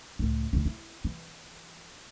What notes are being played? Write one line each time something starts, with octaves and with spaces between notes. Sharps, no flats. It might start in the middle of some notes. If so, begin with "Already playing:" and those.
C#2 A2
D2 C#3
E4
E3